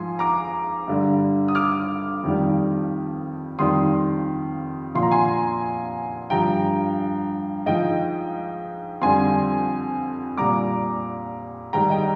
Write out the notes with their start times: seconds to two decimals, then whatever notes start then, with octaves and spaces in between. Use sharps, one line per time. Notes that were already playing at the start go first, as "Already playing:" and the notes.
Already playing: G#2 F3 G#5 C6
0.19 A#5 D6
0.88 G2 D3 G3
1.48 D#6
1.55 D6 F6
2.23 F2 D#3 G3
3.59 F2 D#3 G3 C6 D#6
4.95 A#2 F3 C6
5.03 A#5
5.11 G#5 C6
6.30 G2 F3 G5 A#5
7.66 G#2 F3 D#5 G5
9.02 F2 D3 G3 G#5 C6
10.37 A#2 G3 A#5 D6
11.73 G#2 D#3 G3 G5 A#5
11.90 D#5 G5